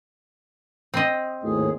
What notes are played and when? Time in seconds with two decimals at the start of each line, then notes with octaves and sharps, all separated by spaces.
0.94 C4 D#5
1.43 G#1 D#2 A2 G#4